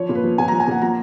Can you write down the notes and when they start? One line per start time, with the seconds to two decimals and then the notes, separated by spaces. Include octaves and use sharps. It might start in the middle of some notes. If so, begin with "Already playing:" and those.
Already playing: F3 C#5
0.09 A#2
0.15 B4
0.23 F3
0.38 A#2 G#5
0.48 F3 A#5
0.60 G#5
0.67 A#2 F#5
0.82 F3 A#5